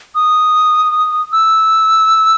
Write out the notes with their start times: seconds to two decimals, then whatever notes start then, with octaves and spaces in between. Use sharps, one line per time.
0.15 D#6
1.33 E6